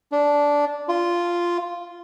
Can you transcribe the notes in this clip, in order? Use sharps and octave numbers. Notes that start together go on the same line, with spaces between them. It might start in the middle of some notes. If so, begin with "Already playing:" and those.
D4
F4